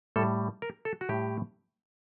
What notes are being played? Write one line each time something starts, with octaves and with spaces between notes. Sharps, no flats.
A2 G3 A4
A#4
A4
F#4
A2 G3 G4